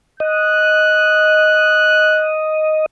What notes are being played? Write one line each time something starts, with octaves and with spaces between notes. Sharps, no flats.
D#5 F#6